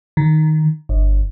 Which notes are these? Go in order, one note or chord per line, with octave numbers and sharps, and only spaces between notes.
D#3
G1